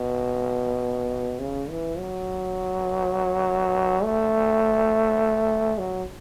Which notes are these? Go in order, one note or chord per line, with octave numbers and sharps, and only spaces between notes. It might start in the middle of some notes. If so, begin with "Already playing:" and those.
Already playing: B2
C#3
E3
F#3
A3
F#3